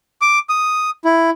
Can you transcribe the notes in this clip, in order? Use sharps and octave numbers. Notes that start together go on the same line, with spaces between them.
D6
D#6
E4